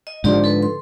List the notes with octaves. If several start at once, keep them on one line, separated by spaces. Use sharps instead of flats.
D#5
G#2 D3 F3 G4 D5 C6
A4 B4
C6